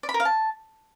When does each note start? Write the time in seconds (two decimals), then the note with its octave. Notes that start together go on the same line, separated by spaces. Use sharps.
0.03 D5
0.09 B5
0.14 A#4
0.20 F5
0.25 A5